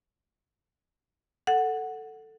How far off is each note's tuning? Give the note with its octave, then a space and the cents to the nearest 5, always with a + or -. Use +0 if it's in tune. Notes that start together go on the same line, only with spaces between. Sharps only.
A4 +10 F#5 +0